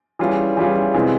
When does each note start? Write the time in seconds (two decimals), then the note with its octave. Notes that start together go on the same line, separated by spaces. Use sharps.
0.19 E3 G3 C#4 F4 G#4
0.57 E3 G3 C#4 F4 G#4
0.94 C3 E3 G#3 C4